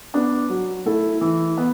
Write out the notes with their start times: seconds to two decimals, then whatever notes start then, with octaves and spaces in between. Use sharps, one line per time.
0.14 B3 D4
0.50 F#3
0.86 A3 E4 A4
1.21 E3
1.58 B3